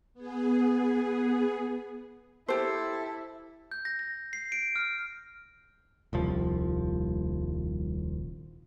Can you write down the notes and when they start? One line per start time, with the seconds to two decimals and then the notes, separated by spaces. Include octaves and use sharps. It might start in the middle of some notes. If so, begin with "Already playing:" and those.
0.14 B3 G#4
2.48 E4 G4 A4 C5
3.71 G6
3.85 A#6
3.99 A#6
4.33 C7
4.52 D7
4.76 F6
6.13 D#1 C2 F3